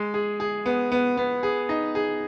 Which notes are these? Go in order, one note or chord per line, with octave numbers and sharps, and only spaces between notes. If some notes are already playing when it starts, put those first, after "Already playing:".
Already playing: G#3
G#4
G#4
B3
B3
B3
G#4
D#4
G#4